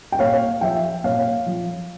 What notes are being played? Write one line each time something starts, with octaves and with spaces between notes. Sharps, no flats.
G5
A#2 C#5 F5
F3 E5 G5
A#2 C#5 F5
F3